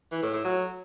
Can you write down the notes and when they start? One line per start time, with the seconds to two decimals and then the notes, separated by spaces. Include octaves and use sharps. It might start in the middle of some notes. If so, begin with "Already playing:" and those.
0.12 E3
0.23 A2
0.33 A2
0.44 F#3